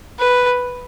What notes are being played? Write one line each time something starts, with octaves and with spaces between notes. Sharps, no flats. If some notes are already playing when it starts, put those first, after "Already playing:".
B4